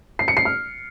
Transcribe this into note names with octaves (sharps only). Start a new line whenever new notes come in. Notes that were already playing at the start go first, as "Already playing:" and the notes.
C7
C#7
C7
F6